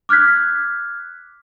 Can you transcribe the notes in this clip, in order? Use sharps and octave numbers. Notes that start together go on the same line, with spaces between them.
D6 F6 F#6 G#6 B6